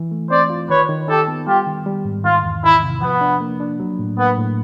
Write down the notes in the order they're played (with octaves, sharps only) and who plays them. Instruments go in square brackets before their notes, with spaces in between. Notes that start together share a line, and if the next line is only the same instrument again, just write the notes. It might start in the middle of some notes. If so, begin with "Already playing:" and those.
Already playing: [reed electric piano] E3
A3
[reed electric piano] C4 [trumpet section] C5 D5
[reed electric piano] F4
[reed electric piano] D#3 [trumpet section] B4 C#5
[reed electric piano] D#3
[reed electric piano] D#4 [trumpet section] G4 A4
[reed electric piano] B3
[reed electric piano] G3 [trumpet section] F4 G4
[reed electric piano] D#3
G3
G#2
[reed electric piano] D#3 [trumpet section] F4
[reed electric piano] E2
[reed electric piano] D#3 [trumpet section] E4
[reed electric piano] C3
[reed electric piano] F3 [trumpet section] B3
[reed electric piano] D4
A#3
D4
F#3
A2
[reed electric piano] A#3 [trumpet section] B3
[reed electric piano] A2